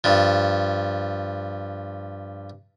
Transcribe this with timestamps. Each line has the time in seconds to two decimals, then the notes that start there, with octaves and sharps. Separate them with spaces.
0.04 G2 F3